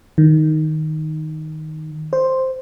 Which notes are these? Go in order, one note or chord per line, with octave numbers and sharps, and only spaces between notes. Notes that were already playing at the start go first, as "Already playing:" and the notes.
D#3
C5